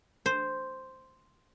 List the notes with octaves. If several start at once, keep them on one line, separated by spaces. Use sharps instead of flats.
C5